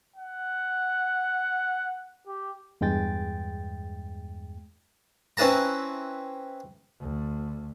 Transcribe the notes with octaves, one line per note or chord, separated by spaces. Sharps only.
F#5
G4
E2 G2 G#3 G5 A6
C4 C#4 E4 B4 A5 A#5
D2